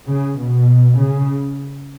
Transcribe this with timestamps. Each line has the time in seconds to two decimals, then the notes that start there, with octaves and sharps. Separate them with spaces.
0.09 C#3
0.38 B2
0.98 C#3